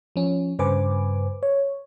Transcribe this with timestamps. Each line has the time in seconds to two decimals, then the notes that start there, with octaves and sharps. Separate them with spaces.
0.16 F3 C#4
0.59 G2 C#3 B4 C5 G#5 D6
1.43 C#5